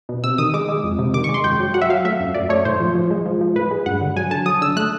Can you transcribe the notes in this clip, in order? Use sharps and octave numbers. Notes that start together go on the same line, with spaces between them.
B2
C3 E6
D#3 D#6
G#3 D6
G#3
F2
C3
D#3 D6
C#6
G#3
C6
F#2 G5
F#3
F#3 F#5
E5
F#3 F5
A3 E5
F#2
F#2 D5
A3 C#5
A2 C5
F3
F3
G#3
F3
F3
A2 B4
G#3
G2 F#5
D3
F#3 G#5
D3 A5
F#3 D#6
D3 E6
A3 F#6